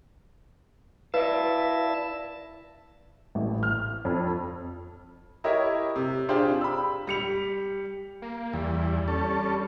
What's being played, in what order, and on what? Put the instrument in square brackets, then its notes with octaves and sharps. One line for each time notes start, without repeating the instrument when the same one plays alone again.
[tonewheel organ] E4 E5 A5 [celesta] B4 [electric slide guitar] D5 F5
[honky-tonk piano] A1
F6
F2
[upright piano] E4 G4 A#4 C#5 D#5 E5
C3
D4 F4 G4 G#4 C5 D5
B5 E6
G3 C#7 F7
[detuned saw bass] A#3
[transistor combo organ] E2 [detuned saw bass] G3
[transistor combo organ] C#4 A4